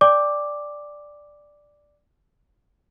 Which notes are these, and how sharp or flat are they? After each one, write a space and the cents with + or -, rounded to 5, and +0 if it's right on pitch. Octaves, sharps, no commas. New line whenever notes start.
D5 +0 G5 +35 D6 +0